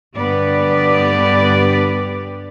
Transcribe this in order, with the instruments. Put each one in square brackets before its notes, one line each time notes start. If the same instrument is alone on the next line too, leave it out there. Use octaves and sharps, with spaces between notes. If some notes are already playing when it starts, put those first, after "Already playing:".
[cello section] G2 D3 B3 G4 B4 D5